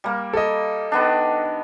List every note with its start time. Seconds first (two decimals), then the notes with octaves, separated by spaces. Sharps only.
0.04 G3 A#3
0.33 A4 D#5
0.92 D#3 B3 D4